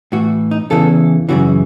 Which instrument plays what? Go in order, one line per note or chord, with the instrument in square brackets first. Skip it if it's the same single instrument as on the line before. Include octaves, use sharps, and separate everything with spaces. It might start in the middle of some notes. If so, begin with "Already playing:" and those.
[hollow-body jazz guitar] A2 E3 F#4
D#4
E2 C#3 E3 A4
F#2 C#3 E3 F#4